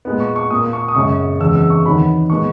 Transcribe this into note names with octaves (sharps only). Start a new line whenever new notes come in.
A#2 G#3 B3
C#6
C#6
A#2 A#3 D#6
C#6
D#6
F#2 C#3 G#3 C#6
E2 C#3 G#3 E6
E6
C#6
E2 D#3 F#3 B3 B5
A#2 G#3 B3 C#6